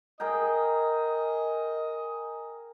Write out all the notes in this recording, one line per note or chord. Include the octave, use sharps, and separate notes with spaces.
G#4 A#4 D#5 G5